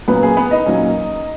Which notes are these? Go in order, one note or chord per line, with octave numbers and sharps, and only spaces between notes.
A#2 F#3 A#3 B3 C#4 B4
G#4
B3 B4
D#4 D#5
A#2 F#3 A#3 C#4